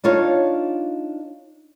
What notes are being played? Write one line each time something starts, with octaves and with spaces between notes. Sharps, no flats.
D4 D#4 F4 C#5